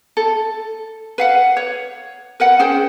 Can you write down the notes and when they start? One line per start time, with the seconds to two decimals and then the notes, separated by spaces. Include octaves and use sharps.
0.17 A4
1.18 B4 F5 F#5
1.57 C#5
2.40 A#4 B4 F#5
2.59 C#4 G#4 C5 G5